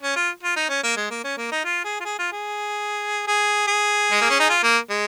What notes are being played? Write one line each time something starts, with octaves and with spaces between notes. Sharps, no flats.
C#4
F4
F4
D#4
C#4
A#3
G#3
A#3
C#4
A#3
D#4
F4
G#4
F4
G#4
F4
G#4
G#4
G#4
G#3
A#3
C#4
D#4
F4
A#3
G#3